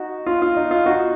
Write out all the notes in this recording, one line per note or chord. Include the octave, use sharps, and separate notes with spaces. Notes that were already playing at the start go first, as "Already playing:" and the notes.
Already playing: D#4 F#4
F4
F4
D#4
F4
D#4 F#4